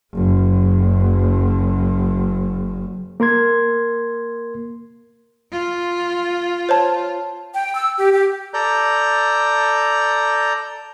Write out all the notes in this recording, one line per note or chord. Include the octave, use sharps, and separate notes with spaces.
F#1 F#2
A#3 A#4 C6 G#6
F4
C5 C#5 A5
G5
E6
G4
G4
A4 D5 A#5 G6